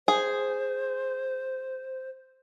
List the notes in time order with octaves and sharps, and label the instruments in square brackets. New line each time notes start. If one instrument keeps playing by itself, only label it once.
[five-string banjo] G#4 [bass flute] C5